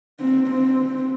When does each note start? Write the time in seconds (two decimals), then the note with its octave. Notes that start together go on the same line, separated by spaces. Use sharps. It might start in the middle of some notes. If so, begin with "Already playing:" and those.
0.20 C4
0.50 C4